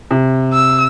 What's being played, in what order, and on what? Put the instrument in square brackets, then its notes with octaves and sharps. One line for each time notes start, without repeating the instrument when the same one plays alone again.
[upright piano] C3
[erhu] E6